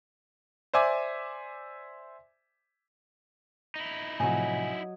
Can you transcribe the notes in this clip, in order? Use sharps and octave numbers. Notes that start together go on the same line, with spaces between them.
C5 D5 E5 G#5 D6
D#4 E4
A2 C3 F3 F#3 D#5 G#5